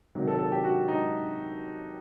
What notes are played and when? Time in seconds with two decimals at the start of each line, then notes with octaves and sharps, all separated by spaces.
0.15 C3 D#3 F#3
0.27 A4
0.39 A4
0.52 G4
0.64 F#4
0.88 D#4